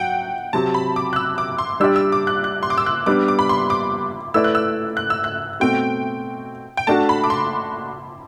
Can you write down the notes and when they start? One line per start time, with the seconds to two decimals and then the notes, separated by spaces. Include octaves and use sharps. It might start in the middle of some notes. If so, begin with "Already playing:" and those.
Already playing: F#3 F#5 G5
0.53 C3 F#3 C4 G4 A5
0.74 B5
0.96 D6
1.13 F#6
1.16 E6
1.38 D6
1.58 C6
1.80 G3 D4 G4 D5 E6
1.96 E6
2.12 D6
2.27 F#6
2.44 F#6
2.63 C6
2.70 D6
2.78 E6
2.86 F#6
3.06 G3 B3 D4 D6
3.28 D6
3.39 B5
3.49 C6
3.70 D6
4.34 A3 E4 B4 D5 E6
4.44 F#6
4.55 E6
4.97 F#6
5.10 E6
5.24 F#6
5.60 B2 A3 C4 F#4 G5
6.77 G5
6.87 A3 D4 F#4 A5
7.09 B5
7.24 D6
7.30 C6